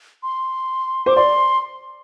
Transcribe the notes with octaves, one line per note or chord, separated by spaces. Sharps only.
C6
C5 D6
D5 C6